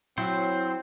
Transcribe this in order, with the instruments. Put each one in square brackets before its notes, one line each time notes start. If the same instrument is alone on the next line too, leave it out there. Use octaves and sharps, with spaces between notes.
[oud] F#3 E4 [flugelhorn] C4 [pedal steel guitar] C5